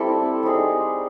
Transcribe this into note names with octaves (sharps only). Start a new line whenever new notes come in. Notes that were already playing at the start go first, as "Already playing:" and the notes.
Already playing: G3 C4 E4 A4
G3 C4 D#4 G#4